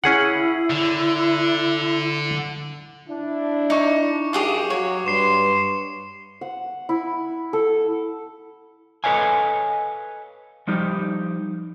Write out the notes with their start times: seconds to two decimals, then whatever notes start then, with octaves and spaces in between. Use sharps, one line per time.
0.04 C#4 E4 G#4 F#5
0.70 D3
3.09 D4 E4
3.70 D#4 C#6 D6 C#7
4.33 F#2 F4 G4 G#4 C#6 D6
4.70 F#3 C#5
5.06 G2 B4 C6 C7 E7
6.41 F#5
6.89 E4
7.53 A4
9.04 A4 B4 C#5 D#5 F5 G#5
10.67 F3 G3 D#4 G4